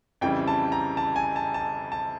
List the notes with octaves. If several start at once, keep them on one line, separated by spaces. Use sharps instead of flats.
F2 C#3 E3 G3 G5
A5
A#5
A5
G#5
A5
A5
A5